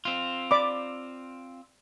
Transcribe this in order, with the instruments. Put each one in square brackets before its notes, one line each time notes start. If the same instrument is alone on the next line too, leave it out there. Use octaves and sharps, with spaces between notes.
[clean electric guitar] C4 F4
[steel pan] D5 B5 D6